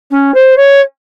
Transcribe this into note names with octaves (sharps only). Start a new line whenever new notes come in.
C#4
C5
C#5